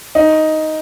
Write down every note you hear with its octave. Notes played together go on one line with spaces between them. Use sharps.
D#4